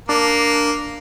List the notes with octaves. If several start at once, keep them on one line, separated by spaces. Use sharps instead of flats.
A#3 D4